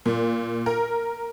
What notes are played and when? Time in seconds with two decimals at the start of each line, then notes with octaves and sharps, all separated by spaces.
0.06 A#2
0.66 A#4